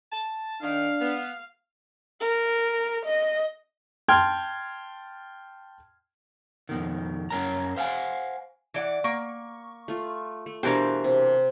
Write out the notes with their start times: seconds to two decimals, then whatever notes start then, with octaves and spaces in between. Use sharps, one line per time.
0.12 A5
0.62 D#3 D4 F5
1.01 B3
2.21 A#4
3.06 D#5
4.08 G5 A5 C6 F6 G#6
6.69 F2 B2 D#3
7.30 F#2 C#4 A#4 A5 A#5
7.76 C5 F5 F#5 G#5
8.74 E3 D5 F#5
9.04 A#3 C#6
9.88 A3 F4
10.46 A3
10.63 B2 E3 D4 G4 A#4 C5 F5
11.04 C3